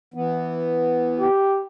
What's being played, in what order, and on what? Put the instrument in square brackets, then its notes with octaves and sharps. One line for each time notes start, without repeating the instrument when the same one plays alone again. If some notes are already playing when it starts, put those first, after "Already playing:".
[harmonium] E3 B3
[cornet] G4